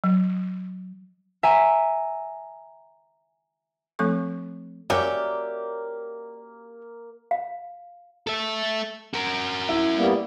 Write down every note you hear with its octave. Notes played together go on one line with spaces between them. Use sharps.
F#3
E5 G#5 A#5
F3 A3 C4 A4 C#6
F#3 A#3 C#4 G4 D5 E5
F5
A4 E5
F#4 A#4
E4
G3 A#3 B3